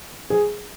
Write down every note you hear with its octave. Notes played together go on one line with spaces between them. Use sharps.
G#4